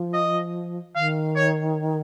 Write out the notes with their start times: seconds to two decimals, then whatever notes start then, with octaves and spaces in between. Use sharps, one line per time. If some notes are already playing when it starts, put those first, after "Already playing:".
Already playing: F3
0.13 D#5
0.95 D#3 F5
1.36 C#5